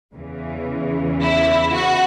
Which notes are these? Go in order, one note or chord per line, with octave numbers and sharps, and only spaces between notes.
E2 C#3 E3
E4
F#4